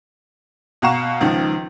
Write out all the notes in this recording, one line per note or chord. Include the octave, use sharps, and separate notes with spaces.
B2 F5 F#5 A#5 C#6 E7
C#2 D#3 F3